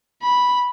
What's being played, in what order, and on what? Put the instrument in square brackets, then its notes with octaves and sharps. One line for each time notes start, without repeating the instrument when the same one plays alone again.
[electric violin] B5